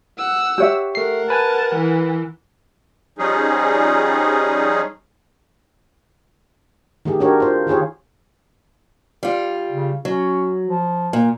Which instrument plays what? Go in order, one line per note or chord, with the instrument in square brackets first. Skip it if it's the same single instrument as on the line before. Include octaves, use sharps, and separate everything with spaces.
[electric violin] F#5 E6
[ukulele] G4 C#5 E5
[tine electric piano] A3 C7 [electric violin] A#4 F#5
[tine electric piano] B4 G#5 [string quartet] A5
[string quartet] E3
[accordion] F3 G3 C#4 D#4 G#4
[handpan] D#3 A3 G4 G#4
D4 F#4 G4 A#4 C#5
F4 C5
D#3 F4 G4 G#4 C#5
[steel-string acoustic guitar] G3 F4
[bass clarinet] C#3
[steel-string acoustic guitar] F#3 [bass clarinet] C#4
[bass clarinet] F3
[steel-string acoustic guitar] A#2